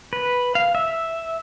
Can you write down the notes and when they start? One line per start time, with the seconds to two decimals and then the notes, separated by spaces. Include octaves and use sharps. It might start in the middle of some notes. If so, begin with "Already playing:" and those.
0.13 B4
0.55 F5
0.75 E5